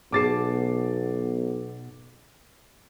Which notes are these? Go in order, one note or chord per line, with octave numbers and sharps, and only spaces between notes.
B1 B2 G#4 A5 D6 A6 C7